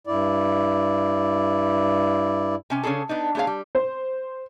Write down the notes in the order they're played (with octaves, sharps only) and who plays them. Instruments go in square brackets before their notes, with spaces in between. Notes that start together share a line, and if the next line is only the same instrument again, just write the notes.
[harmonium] G2 E4 D5
[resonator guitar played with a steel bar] C3 C#4 G#5
C#3 C#4 D4 E4 G#4 A4
B3 D4 D#4
A3 B3 G#4 C#5 F5
G3
[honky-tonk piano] C5